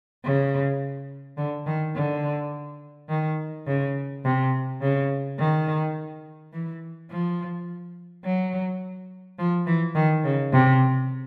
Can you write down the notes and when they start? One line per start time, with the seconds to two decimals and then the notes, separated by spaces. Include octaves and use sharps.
0.24 C#3
1.37 D3
1.66 D#3
1.94 D3
3.09 D#3
3.66 C#3
4.24 C3
4.81 C#3
5.38 D#3
6.52 E3
7.09 F3
8.24 F#3
9.38 F3
9.66 E3
9.95 D#3
10.24 C#3
10.52 C3